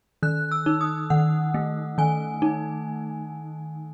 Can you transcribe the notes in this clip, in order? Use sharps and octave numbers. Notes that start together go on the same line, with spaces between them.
D#3 F#6
E6
D#4
D#6
D#3 F#5
A3
D#3 G#5
D#4